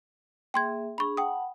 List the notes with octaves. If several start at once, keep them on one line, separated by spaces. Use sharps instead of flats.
A#3 G#4 E5 G5 C6 G#6
D4 G#4 B5 C#6
F#5 G5 A5 B5 D#6